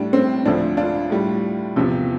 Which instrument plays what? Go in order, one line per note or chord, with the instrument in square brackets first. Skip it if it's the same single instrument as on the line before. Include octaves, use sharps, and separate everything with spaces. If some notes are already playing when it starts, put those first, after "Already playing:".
Already playing: [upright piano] A2 G3 D4
C4
D2 D3 F3 D4
D4 F4
A2 G3
E2 C3 F3